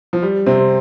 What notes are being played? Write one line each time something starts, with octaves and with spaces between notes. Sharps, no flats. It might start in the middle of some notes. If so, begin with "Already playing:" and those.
F3
G3
C3 C4